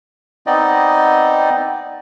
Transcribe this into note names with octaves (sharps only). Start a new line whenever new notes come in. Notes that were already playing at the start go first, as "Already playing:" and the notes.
B3 C4 D#4 D5 D#5